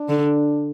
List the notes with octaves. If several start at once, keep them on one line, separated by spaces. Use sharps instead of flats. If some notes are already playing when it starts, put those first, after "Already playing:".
Already playing: D4
D3